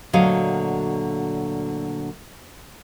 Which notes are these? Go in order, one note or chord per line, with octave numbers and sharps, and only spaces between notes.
D2 A#2 D3 F#3 D#5 F5